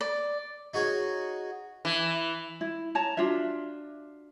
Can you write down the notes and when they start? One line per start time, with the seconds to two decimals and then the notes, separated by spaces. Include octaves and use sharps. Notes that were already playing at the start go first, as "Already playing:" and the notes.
0.01 D5
0.74 D#4 F#4 G#4 C#5
1.85 E3
2.61 E4
2.95 C#5 A5 A#5
3.17 D4 F4 F#4 E5